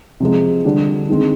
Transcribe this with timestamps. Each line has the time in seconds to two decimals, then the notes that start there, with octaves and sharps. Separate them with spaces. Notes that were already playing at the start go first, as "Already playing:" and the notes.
0.20 C3 F3 G#3
0.65 D3 G3 D4
1.09 D#3 G#3 C4